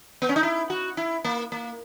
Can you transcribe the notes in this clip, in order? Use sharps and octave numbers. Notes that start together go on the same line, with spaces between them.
B3
C#4
D#4
E4
F#4
E4
A#3
A#3